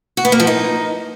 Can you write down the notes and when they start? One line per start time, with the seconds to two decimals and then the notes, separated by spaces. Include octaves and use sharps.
0.17 F#4
0.25 B3
0.32 A#3
0.40 F3
0.47 D#4